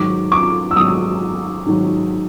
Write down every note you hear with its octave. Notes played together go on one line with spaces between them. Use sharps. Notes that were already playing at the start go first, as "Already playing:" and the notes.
Already playing: G#2 D#3 F#3 D6
D6
E6
G#2 D#3 F#3 D#6
G#2 D#3 F#3